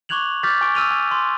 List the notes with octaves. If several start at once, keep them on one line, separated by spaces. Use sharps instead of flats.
C#6 D6 F#6 G#6 F7 F#7
D6 F6 G6 A6 B6
G#5 C#6 D6 D7
E6 F6 D#7 F7 G7
G#5
C6